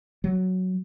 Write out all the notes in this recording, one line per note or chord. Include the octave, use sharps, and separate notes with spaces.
F#3